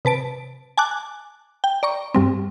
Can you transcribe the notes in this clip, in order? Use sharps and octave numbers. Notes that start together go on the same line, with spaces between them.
C3 B4 A5 D7
G#5 A5 D6 F#6
G5
D5 A#5 C#6
G2 G3 C4